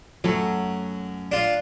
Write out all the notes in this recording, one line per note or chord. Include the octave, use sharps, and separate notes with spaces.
F#2 F#3 A3
D4 F4